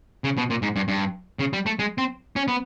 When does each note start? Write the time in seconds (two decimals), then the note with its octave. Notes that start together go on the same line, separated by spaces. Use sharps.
0.24 C#3
0.37 B2
0.50 A#2
0.62 G#2
0.76 G2
0.88 G2
1.39 C#3
1.53 G3
1.66 A3
1.79 G#3
1.98 C4
2.36 C#4
2.48 B3